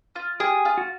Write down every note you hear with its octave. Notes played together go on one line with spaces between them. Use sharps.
F4
G4 G#4
F4
F#4